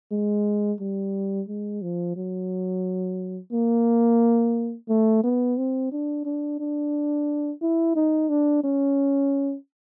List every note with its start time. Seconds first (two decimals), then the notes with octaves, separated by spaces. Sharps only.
0.12 G#3
0.80 G3
1.48 G#3
1.82 F3
2.16 F#3
3.53 A#3
4.89 A3
5.24 B3
5.58 C4
5.92 D4
6.25 D4
6.60 D4
7.62 E4
7.96 D#4
8.29 D4
8.64 C#4